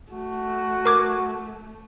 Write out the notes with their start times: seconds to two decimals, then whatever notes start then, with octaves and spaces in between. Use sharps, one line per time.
0.12 A3 F#4
0.86 A#4 D6 G#6